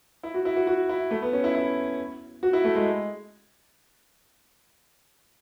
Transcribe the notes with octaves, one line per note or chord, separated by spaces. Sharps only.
E4
F#4
E4
F#4
F#4
E4
A3
B3
C#4
E4
E4
F#4
E4
A3
G#3